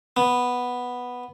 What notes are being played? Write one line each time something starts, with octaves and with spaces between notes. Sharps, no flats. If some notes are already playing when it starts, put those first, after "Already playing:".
B3